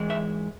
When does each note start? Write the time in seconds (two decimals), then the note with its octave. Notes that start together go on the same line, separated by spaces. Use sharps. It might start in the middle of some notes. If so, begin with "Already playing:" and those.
Already playing: G#2 E3 G#3
0.10 E5